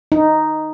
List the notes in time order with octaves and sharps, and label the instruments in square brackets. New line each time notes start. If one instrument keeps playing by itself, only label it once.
[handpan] D#4